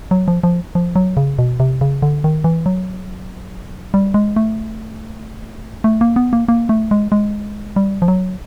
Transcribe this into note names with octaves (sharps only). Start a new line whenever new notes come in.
F#3
F3
F3
F3
F#3
C#3
B2
C3
C#3
D3
D#3
E3
F#3
G3
G#3
A3
A3
A#3
B3
A#3
A#3
A3
G#3
G#3
G3
F3
F#3